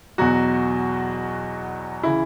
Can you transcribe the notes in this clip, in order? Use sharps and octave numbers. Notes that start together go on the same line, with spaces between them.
E2 B2 F#3 F#4
C#3 E3 E4